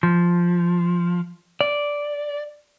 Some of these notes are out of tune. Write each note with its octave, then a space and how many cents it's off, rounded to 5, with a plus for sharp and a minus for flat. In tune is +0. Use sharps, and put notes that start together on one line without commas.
F3 +0
D5 -5